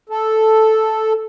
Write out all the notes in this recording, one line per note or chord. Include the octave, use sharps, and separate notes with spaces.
A4